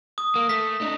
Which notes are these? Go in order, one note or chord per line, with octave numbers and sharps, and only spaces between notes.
D#6
A#3
A3 B6
D4 D#4